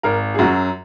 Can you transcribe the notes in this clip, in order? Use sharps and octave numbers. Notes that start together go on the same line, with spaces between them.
G#1 A#4
G#4
F#2 F#3 F#4